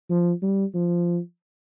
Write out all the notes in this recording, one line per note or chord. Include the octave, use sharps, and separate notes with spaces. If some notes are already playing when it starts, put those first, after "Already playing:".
F3
G3
F3